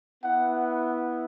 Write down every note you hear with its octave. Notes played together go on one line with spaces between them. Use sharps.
B3 E4 F#5